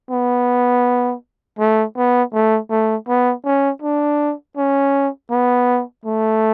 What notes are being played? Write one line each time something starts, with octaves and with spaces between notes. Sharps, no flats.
B3
A3
B3
A3
A3
B3
C#4
D4
C#4
B3
A3